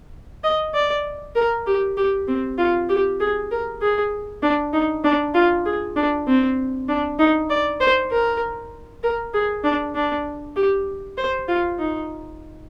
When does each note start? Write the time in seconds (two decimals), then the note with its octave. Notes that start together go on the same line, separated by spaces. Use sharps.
0.44 D#5
0.74 D5
1.35 A#4
1.66 G4
1.97 G4
2.28 C4
2.58 F4
2.89 G4
3.20 G#4
3.51 A#4
3.81 G#4
4.42 D4
4.73 D#4
5.04 D4
5.34 F4
5.65 G#4
5.96 D4
6.27 C4
6.88 D4
7.19 D#4
7.50 D5
7.80 C5
8.11 A#4
9.03 A#4
9.34 G#4
9.64 D4
9.95 D4
10.56 G4
11.17 C5
11.48 F4
11.79 D#4